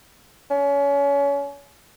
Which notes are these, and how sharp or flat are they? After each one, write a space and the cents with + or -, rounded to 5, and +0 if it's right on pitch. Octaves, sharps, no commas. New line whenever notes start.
C#4 +30